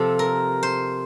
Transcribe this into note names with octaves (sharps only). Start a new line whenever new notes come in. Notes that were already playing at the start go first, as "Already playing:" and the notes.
Already playing: C3 F3 C4 A4
A#4
C5